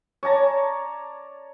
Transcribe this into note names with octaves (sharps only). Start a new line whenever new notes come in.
C#5 D5 A5 A#5